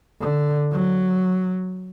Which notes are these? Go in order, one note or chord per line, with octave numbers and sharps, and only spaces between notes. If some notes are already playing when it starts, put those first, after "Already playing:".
D3
F#3